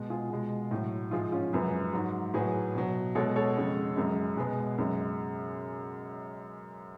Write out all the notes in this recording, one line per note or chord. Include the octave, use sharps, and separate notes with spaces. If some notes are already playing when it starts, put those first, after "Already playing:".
Already playing: B2 G#3
F4 G#4
B2 G#3
A2 F#3
G#2 F3 G#3 F4 G#4
C#4 F4
F#2 C#3 F3 G#3 G#4 B4
G#2 F#3
A2 F#3 G#4 B4
B2 F#3
B2 G#3 A4 C#5
A4 C#5
F2 C#3 G#3
F#2 C#3 G#3
B2 G#3 G#4 B4
F#2 C#3 G#3